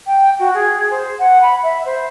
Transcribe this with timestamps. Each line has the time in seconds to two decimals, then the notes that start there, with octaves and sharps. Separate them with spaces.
0.07 G5
0.39 F#4
0.54 G#4
0.90 C5
1.19 F#5
1.42 B5
1.63 E5
1.85 C5